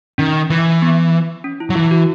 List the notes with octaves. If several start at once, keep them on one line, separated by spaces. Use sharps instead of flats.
D#3 C#4
E3
B3
C#4
E4
F#3
E3 E4
F#4